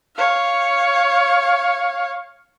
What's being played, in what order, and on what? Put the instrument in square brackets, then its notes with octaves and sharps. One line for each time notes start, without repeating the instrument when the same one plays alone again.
[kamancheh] C#5 F5